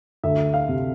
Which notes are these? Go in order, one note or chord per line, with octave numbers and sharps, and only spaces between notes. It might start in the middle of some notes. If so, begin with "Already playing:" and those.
D2 E5
F5
C3